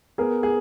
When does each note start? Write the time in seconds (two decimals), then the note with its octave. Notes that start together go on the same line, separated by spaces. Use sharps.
0.18 B3 G#4 A#4
0.43 G#4